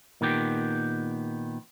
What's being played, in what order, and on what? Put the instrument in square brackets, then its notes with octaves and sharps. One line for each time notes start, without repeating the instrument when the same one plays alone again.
[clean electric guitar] A#2 D#3 B3 G4